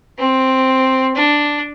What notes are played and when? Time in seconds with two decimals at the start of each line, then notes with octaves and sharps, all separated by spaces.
0.19 C4
1.16 D4